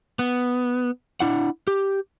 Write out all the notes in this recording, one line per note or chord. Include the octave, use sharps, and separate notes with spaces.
B3
D4 E4 F#5
G4